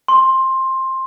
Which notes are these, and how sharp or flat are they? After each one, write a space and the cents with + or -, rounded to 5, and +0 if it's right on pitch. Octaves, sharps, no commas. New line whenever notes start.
C6 +15